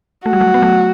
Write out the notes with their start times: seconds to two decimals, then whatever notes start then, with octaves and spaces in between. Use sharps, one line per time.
0.25 A3 F#4
0.33 G3
0.41 F#3 A3
0.54 B3
0.62 F#3 A3